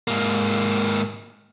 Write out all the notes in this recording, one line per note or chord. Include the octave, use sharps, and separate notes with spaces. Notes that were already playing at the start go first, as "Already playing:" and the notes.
G#2 A#3